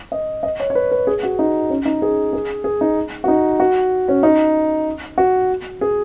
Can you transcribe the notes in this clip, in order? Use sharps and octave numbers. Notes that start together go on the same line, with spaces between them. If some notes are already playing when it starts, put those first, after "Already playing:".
D#5
D#5
C#5
C#5
B4
B4
G#4
F#4
D#4
C#4
D#4
G#4
G#4
G#4
D#4
F#4
D#4
F#4
C#4
D#4
F#4
G#4